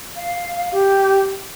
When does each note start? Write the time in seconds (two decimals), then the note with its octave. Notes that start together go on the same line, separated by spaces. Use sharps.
0.16 F5
0.72 G4